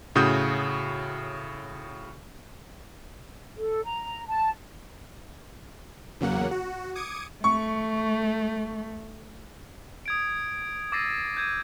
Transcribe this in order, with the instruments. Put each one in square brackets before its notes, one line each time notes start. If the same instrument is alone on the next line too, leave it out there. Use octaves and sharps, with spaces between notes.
[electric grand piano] A2 C#3 F#4 D#6 G6
[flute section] A4
A#5
A5
[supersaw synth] E2 C#3 F#3 A#3 F#5
F#4
D6 D#6 G#6 C#7 D#7
[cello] A3 [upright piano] C#6
[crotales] D#6 G#6 D7
D6 E6 A6 A#6 C7 D#7
G6 G#6 D#7